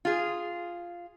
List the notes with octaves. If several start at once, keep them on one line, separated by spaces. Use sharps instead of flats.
F4 G#4